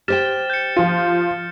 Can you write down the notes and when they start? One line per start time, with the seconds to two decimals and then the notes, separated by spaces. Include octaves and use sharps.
0.08 G4 C5 G5 F6 A6 E7
0.50 G6 C#7
0.76 F3 F4